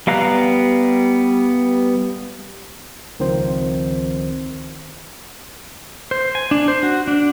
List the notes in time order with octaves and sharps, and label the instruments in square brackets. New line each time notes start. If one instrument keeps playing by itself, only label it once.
[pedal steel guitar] G3 B3 F5 A#5 F#6
[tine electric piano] C#2 D#3 F3 C4 C5
[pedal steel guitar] C5
G#5
D4
C5
F#4
D4